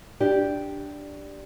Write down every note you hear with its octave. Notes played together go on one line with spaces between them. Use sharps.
D4 G4